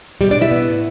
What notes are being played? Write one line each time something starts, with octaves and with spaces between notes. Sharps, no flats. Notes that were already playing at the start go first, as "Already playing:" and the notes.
B2 G3 G4
D4 D5
B2
E4 E5
B3
A2